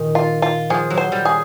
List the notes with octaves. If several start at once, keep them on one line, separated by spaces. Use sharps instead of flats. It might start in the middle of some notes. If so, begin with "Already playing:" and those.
Already playing: A#2 D#3
F4
F4
F3 G#4
F#3
C5
G3
G#4